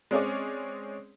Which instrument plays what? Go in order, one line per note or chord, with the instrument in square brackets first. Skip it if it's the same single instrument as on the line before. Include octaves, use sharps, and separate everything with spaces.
[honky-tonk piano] G#3 C4 C#4 G#4 C#5 D5